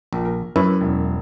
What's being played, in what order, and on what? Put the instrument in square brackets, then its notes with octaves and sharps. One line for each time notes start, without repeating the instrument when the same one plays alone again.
[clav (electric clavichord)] A#1 [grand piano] A#2
[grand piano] A#4
[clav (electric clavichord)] F#2 [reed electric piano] C#4 E4 [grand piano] B4
[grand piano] E1